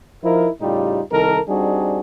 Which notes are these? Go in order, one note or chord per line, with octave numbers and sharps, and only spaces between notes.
F3 D#4 E4 A#4
A2 C#3 G3 D#4 F4 G4
C2 D#3 A4 A#4
G3 C4 D4 D#4 F#4 G#4